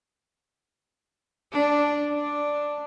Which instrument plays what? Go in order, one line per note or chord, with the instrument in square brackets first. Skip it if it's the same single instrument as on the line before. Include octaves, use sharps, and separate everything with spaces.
[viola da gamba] D4
D4